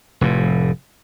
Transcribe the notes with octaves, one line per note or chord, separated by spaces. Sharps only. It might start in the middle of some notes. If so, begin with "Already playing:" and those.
F1 A2